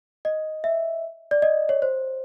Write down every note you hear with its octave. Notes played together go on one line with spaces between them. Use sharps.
D#5
E5
D5
D#5
C#5
C5